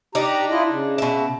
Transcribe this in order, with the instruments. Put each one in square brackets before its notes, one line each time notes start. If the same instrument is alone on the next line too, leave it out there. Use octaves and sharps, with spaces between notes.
[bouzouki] D4 D#4 [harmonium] G4 A#5
[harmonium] E4 F4 D#5
C#3
[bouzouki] B2 E5